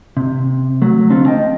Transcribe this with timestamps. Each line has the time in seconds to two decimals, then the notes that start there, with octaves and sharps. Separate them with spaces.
0.17 C3
0.82 F#3 A3
1.10 D3 C4 F4 A4
1.26 D#5 G5 A5